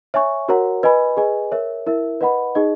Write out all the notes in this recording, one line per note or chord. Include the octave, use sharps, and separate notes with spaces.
C#5 E5 G#5 C#6
F#4 A#4 C#5 F#5 A#5
B4 D#5 G#5 B5
G#4 B4 D#5 G#5
A#4 C#5 E5
E4 A#4 E5
B4 D#5 F#5 B5
D#4 G#4 D#5